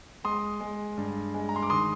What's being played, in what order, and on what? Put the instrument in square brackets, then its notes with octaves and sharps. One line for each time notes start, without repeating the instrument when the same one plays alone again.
[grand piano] G#3 C6 D#6
G#3
G2
G#3
A#5
C6
D6
D#3 C6 D#6